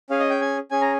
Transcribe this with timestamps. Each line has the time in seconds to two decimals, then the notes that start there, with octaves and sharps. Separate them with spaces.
0.10 C#4 G#4 F5
0.20 D#5
0.30 G5
0.41 G#5
0.71 C#4 G#4 G#5
0.81 A#5